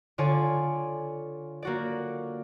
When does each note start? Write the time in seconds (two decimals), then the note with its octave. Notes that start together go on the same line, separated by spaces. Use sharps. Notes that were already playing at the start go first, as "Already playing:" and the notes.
0.18 D3 F4 C#5 D5 G#5
1.63 A#3 F#4 D5